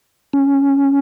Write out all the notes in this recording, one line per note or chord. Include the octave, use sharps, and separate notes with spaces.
C#4